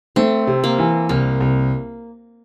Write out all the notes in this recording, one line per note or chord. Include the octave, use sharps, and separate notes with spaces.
A3 C4
C3
A#3
E3
C2 A#3
C2